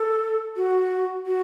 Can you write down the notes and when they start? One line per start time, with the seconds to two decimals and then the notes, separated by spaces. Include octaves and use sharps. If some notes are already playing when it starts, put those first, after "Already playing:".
Already playing: A4
0.56 F#4
1.26 F#4